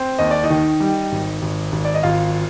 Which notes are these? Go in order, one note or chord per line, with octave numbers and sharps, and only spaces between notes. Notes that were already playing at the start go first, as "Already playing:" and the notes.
Already playing: C4
D#2 D#5
D5
D#4 D#5
D#3
G3
G#1
G#1
G#1
D5
D#5
G#1 F4 F5